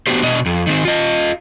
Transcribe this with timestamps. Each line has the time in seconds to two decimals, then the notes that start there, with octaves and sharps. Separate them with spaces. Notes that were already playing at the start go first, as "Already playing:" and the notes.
0.07 B3 D4 F#4 G4 C5
0.23 B2 D4 D#5
0.46 F2
0.67 D#3 C4
0.85 F4 D#5